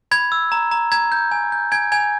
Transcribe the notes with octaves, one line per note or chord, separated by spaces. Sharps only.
B5 G#6
E6
A#5
A#5
A#5 G#6
G6
G#5
G6
G#5 G#6
G#5 G#6